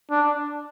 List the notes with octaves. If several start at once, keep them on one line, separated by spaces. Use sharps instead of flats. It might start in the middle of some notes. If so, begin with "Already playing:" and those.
D4